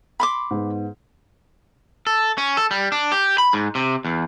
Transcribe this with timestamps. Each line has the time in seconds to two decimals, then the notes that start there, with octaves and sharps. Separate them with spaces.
0.20 B5 C6 D6
0.51 G#2 B3
2.07 A4
2.38 C#4
2.57 A4
2.71 G3
2.92 D4
3.12 G4
3.38 B5
3.53 G#2
3.75 C3
4.05 E2